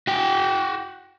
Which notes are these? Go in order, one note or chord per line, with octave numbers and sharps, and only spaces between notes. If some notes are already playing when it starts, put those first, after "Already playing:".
F#4 G5